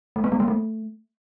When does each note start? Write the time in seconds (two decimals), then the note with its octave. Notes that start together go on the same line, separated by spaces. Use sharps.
0.16 A3
0.24 B3
0.32 G#3
0.40 A#3
0.48 A3